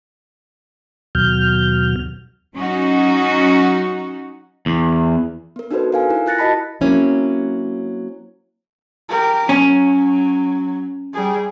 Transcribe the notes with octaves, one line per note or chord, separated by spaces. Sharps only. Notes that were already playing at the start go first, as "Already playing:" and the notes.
D#2 B2 F#3 F6 G6
F#3 C#4 D#4 F#4
E2
B3 A#4
D4 D#4 F#4 A4 B4 C5
A#4 F5 G#5
E4 A#4
E4 F4 F#6 A6 A#6 C#7
F#4 A#4 D#5 A5 B5 B6
F#3 A#3 C4 C#4 E4
G4 A#4
F#3 C#4
G3 G#4